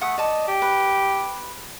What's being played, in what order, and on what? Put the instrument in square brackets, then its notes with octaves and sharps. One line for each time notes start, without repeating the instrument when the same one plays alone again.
[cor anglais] A3 [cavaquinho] F#5 D#6
[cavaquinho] D5 A5 [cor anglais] D#5
[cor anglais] G4
[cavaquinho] B4